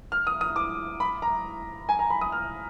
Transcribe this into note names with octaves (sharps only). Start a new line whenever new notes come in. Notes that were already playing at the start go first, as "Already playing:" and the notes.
F6
D#6
D#6
D6
B5
A#5
G#5
A#5
B5
D#6
F6